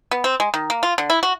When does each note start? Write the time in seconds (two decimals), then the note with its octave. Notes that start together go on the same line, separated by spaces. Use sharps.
0.11 B3
0.24 C4
0.40 G#3
0.54 D#3
0.70 A#3
0.83 F4
0.98 D3
1.10 E4
1.23 F#4